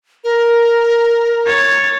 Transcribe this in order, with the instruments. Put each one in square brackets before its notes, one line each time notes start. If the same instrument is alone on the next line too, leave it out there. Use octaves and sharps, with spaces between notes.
[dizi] A#4
[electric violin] C#5 A6